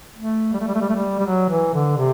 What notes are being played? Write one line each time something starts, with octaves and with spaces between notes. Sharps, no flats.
A3
G3
A3
G3
A3
G3
A3
G3
G3
F#3
E3
D3
C3